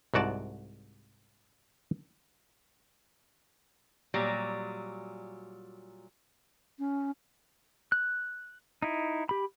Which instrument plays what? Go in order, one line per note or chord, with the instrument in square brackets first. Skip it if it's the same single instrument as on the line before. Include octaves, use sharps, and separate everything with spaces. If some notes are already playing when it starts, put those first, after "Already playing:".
[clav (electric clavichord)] C2 G#2 F#4 D5 A5
[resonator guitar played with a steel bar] A#2 F#3 G3
[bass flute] C#4
[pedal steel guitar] F#6
D#4 E4
G4 B5